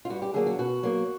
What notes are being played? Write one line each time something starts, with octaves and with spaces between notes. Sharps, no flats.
F4
G2 F#4
G4
D3 F#3 A#3 G#4
F#4
B2 F#4
F#3 A#3